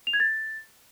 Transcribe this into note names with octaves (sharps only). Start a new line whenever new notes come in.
F7
G#6
A6